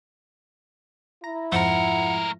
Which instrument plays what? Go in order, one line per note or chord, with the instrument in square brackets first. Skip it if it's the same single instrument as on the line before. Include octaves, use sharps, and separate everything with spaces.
[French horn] E4 [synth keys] A#5
[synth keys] F2 G#2 F3 [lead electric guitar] A3 A#4 [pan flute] F#5